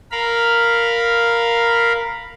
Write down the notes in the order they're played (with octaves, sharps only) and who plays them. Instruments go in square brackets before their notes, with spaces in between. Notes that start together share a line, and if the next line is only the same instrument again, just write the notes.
[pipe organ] A#4 F5 B5